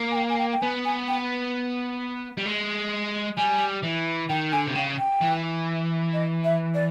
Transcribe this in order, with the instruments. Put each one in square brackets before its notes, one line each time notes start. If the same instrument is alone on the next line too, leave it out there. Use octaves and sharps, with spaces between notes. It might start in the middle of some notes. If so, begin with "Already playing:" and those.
Already playing: [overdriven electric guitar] A#3
[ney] G#5
G5
G#5
G5
G5
[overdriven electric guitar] B3 [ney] G#5
[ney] G#5
G5
[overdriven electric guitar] G3
G#3
[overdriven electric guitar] G3 [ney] G#5
[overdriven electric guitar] E3
[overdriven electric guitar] D#3 [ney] G5
[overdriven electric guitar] D3 [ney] G#5
[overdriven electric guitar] C3
[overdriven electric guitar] C#3 [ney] G5
[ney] G5
[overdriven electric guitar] E3
[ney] D#5
E5
D5